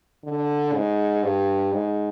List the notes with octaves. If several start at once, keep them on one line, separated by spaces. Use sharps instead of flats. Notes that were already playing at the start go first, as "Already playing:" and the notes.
D3
G#2
G2
G#2